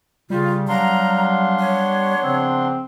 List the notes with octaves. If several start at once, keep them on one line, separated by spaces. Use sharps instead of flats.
C#3 G3 F4
F#3 B3 D4 F5 A#5 C6
C#5
C#3 F3 C4